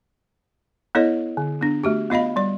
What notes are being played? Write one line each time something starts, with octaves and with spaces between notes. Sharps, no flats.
B3 E4 A4 C#5 D#5
D3
B3 D4
A3 F#4 G4
B3 F4 D#5 F5 B5
G3 D5